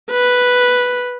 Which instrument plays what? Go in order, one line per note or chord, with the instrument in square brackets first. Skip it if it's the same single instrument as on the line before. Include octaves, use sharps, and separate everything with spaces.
[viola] B4